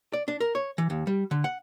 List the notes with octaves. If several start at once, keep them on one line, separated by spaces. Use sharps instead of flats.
D5
D4
A#4
C#5
E3
D#2
G3
D3
F#5